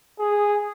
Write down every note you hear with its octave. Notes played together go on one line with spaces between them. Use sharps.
G#4